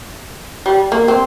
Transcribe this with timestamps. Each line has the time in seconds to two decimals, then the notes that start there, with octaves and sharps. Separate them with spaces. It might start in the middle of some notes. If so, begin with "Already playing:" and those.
0.66 G3
0.92 A#3
1.08 C4